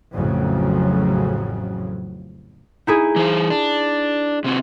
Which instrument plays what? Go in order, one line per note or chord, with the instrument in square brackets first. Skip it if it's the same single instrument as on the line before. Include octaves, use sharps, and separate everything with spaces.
[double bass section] A1 F2 A2 C#3 F#3
[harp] D#4 E4 G#4
[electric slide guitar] E3 C5
D4
C3 C4 F#4